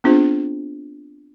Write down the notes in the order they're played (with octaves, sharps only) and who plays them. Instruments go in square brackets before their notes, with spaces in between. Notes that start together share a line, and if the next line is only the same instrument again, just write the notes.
[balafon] B3 C4 D4 F4 G#4 C5